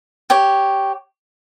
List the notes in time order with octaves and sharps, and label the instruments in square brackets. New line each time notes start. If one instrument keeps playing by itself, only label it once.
[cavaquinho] G4 C#5